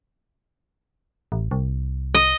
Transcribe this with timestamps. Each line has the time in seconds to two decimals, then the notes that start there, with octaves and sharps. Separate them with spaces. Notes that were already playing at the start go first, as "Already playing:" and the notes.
1.32 A1
1.51 C2
2.15 D#5